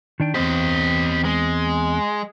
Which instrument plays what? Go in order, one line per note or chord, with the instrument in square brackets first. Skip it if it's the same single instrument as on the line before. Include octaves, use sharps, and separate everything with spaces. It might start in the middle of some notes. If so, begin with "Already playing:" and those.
[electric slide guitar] D#3 D4 G5
[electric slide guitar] E2 C4 C5 [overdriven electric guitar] G4 D#5
[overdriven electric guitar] G#3